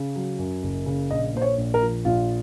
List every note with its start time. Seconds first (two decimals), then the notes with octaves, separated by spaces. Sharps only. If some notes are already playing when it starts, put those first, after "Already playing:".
Already playing: C#3
0.16 F#3
0.39 F#2
0.63 F#1
0.86 C#3
1.11 A#1 D#5
1.34 A#2 C5
1.42 C#5
1.57 A#1
1.74 A#4
1.82 F3
2.05 A#1 F4